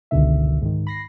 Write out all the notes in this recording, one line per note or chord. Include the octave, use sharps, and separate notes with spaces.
G1 C#2 B2 D3 D#3 E5
G#2 D#3
B5 A#6 C7